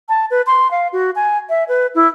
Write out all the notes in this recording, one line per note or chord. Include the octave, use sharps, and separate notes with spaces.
A5
B4
C6
F5
F#4
G#5
E5
B4
E4